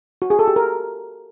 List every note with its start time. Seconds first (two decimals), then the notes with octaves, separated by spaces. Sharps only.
0.22 F#4
0.30 G#4
0.39 A4
0.48 G4
0.56 A#4